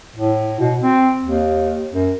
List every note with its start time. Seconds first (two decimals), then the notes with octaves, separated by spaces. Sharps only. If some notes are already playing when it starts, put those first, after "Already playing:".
0.16 A2
0.60 B2
0.81 C4
1.25 D#2
1.91 F#2